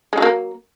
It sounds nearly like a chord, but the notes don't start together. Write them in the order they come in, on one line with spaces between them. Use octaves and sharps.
G#3 F#3 A#3